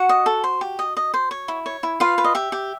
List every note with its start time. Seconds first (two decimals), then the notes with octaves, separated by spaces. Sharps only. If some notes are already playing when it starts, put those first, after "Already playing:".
Already playing: F#4 F#5
0.09 D#5
0.26 A4
0.44 C5
0.61 G4
0.79 D#5
0.97 D#5
1.14 C5
1.31 C#5
1.48 E4
1.66 C#5
1.83 E4
2.00 F4 B4 F5
2.18 B4
2.24 D#5
2.35 G4 E5
2.52 G4